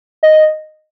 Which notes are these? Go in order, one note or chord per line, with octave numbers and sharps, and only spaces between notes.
D#5